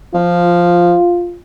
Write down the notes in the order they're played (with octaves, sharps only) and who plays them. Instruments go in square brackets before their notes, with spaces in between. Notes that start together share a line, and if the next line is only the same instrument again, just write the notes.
[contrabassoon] F3 [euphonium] F4